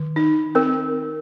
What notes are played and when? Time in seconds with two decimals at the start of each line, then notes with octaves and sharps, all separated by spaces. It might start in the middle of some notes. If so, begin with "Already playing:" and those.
Already playing: D#3
0.16 D#4
0.55 C4 A#4